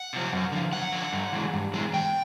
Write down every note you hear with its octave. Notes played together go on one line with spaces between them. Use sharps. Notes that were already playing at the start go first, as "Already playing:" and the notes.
Already playing: F#5
C3 F3
F#2
D3 F3
F#2 F#5
D3 F3
G2
E3 G#3
G2
E3 G#3
G#2 G5